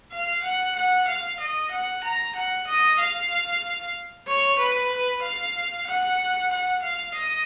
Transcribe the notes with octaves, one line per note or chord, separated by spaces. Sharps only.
F5
F#5
F#5
F5
D#5
F#5
A#5
F#5
D#5
F5
C#5
B4
B4
F5
F#5
F#5
F5
D#5